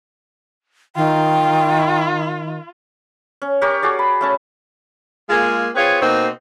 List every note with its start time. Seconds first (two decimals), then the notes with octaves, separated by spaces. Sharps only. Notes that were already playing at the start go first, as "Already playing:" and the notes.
0.96 D#3 F4 G5
3.42 C#4
3.61 C#4 G4 A#4 C#5
3.83 F#4 G#4 D5
3.99 B5
4.21 A3 C#4 A5
5.29 G#3 A#3 F4 G#4
5.75 C4 F4 G#4 B4 C#5
6.02 B2 A#3 C4 D#4 F#4